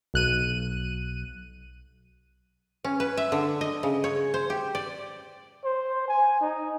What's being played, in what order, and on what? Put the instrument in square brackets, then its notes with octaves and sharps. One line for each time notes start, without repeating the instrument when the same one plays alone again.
[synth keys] B1 F#6 D#7
[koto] C#4
B4
E5
D3
D#5
C#3
C#5
C5
G4
D5
[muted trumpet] C5
G#5
D#4